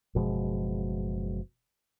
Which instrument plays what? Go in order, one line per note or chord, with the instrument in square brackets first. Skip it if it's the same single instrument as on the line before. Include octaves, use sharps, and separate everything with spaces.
[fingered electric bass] F#1 B2 F3 G#3